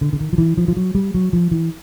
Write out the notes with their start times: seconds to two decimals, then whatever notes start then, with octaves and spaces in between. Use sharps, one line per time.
0.01 D3
0.13 D3
0.20 D#3
0.33 F3
0.38 E3
0.57 F3
0.68 F3
0.77 F#3
0.95 G3
1.14 F#3
1.33 F3
1.51 E3